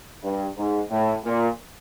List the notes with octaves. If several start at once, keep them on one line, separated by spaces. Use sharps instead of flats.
G2
G#2
A2
A#2